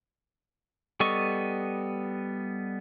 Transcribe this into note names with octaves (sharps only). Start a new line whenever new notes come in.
G3 B3 A4 D#5 C#6